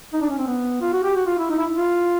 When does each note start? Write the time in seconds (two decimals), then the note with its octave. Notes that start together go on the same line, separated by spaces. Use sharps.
0.13 D#4
0.21 D4
0.30 C#4
0.38 C4
0.47 B3
0.81 F4
0.92 F#4
1.04 G4
1.15 F#4
1.26 F4
1.38 E4
1.50 D#4
1.58 E4
1.75 F4